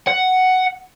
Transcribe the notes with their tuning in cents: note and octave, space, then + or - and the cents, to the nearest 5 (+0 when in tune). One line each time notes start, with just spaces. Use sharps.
F#5 +5